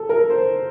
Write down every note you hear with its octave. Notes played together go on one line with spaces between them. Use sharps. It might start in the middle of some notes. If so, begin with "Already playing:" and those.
Already playing: A4
A#4
C5